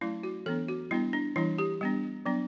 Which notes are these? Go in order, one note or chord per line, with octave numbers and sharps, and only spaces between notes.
F#3 A3 C#4 E4
F#4
E3 B3 D4 A4
F#4
G3 B3 D4 E4
D4
E3 G3 D4 E4
G4
G3 B3 D4
F#3 B3 D4